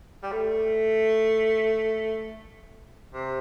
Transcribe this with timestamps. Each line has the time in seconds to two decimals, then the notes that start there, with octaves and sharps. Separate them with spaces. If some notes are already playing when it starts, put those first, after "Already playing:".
0.23 G3
0.32 A3
3.13 C3